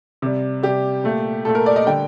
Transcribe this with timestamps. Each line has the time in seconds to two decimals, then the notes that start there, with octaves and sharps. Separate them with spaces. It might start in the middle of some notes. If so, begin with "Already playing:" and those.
0.22 C3 G3
0.63 C3 G3 G4
1.04 A#2 A3
1.45 A#2 A3 A4
1.55 A#4
1.66 D5
1.76 D#5
1.86 D3 G3 G5